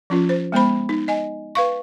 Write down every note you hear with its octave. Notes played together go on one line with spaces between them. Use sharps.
F3 C#4 F4
C5
G#3 B3 C5 B5
D#4
D#5 G#5
B4 F5 C#6